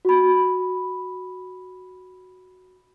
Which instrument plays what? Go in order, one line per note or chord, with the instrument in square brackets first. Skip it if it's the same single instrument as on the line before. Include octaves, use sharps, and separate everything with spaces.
[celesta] F#4 B5